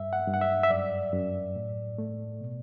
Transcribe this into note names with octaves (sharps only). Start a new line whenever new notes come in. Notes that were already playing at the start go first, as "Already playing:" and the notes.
Already playing: G2 E5
F#5
G2
F#5
E5
E5
F#2 D5
F#2
A2
A3
B2